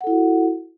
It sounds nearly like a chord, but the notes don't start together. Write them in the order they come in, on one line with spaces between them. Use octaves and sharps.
F#5 A4 E4 F#4